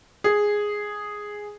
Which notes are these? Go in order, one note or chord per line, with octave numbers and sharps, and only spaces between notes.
G#4